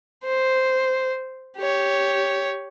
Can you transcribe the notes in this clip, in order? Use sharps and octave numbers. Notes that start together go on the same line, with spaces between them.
C5
G4 C#5